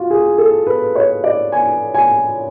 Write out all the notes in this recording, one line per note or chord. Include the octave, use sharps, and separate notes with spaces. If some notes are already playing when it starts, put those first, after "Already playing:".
Already playing: F4 F#4
G#4
A4
B4
C#5
D5
G#5
G#5